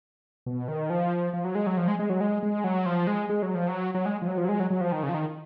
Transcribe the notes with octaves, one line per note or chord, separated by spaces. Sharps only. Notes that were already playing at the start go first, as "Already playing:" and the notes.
B2
D#3
F3
F3
F#3
G#3
F#3
F3
G#3
G#3
F#3
G#3
G#3
F#3
F3
G#3
G#3
F#3
F3
F#3
F#3
G#3
F3
F#3
F3
F#3
G#3
F#3
F#3
F3
D#3
C#3
F3
D#3